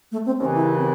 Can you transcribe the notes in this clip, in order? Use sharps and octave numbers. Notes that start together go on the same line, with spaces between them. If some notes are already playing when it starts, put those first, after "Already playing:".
A3
C4
D#2 C#3 E3 C4
E4
C4